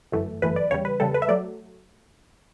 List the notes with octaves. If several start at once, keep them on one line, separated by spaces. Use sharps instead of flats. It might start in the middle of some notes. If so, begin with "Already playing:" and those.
G1 F#2 E3 A3
G1 F#2 E3 A3 B4
D5
E2 C#3 G3 C#5
B4
E2 C#3 G3 A4
B4
E5
F#3 A3 D5